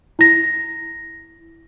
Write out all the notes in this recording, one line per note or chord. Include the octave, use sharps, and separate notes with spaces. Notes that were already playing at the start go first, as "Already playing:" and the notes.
E4 A#6